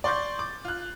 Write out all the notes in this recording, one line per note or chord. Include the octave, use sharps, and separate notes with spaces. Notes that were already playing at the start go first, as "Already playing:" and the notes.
D5 C6 C#6 G6 A6
D6
F4 F#6